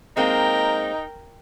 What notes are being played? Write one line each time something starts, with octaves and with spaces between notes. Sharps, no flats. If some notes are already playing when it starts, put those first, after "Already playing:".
G#3 A#3 C4 D#4 A#4 G5